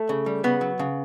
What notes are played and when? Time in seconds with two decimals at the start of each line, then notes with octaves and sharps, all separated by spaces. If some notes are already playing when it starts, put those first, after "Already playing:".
Already playing: A3
0.09 C#3
0.26 G3
0.44 C#3 B3
0.61 F#3
0.79 C#3